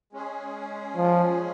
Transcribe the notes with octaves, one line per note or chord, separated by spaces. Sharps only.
G#3 C#4 G#4
F3